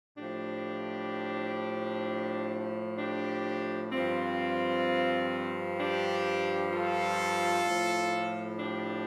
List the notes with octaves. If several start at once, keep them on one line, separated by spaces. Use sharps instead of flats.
A2 F3 D4 G4
D4 G4
G2 F3 C4 F4
D4 G4
F4 A4
A2 F3
D4 G4